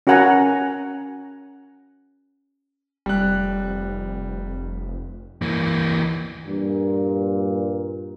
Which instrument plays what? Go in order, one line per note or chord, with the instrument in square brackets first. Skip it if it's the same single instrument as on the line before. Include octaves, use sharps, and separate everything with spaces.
[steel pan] C#4 F#4 A#4 F#5 G#5 A#5
[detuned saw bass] F1 [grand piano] G3 F#6
[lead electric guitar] E3 A#3
[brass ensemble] G2 A#2